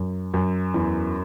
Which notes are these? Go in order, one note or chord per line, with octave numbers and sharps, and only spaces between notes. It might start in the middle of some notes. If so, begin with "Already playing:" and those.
Already playing: F#2
F#2
E2